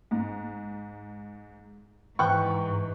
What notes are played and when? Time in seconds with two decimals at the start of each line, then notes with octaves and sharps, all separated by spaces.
0.11 G#2
2.19 G#2 E3 G5 C#6 F#6